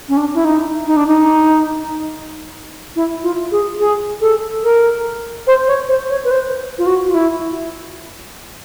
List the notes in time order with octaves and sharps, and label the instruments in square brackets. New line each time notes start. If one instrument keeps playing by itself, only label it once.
[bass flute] C#4
D4
E4
D#4
D#4
D4
D#4
E4
F4
G#4
G#4
A4
A#4
C5
C#5
C5
C#5
B4
C5
F4
F#4
F4
E4